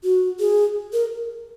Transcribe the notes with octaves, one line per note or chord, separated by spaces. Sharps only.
F#4
G#4
A#4